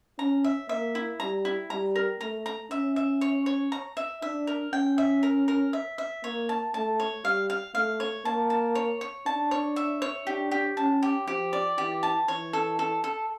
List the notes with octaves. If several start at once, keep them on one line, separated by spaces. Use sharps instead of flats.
C#4 A#5
E5
A#3 E5
E4
G3 A#5
E4
G3 A#5
A#4
A3 A#5
A#5
C#4 E5
E5
C#5
C#5
A#5
E5
D4 E5
A#4
C#4 G5
E5
A#4
A#4
E5
E5
A#3 C#5
A5
A3 A5
C#5
G3 F5
F5
A3 F5
C#5
A#3 A5
A5
C#5
C#5
D4 A5
C#5
E5
C#5
D4 G4
G4
C#4 A5
G4
F3 G4
D5
E3 G4
A5
E3 C#5
A4
A4
A4